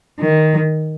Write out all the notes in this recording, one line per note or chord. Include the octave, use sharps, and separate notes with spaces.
D#3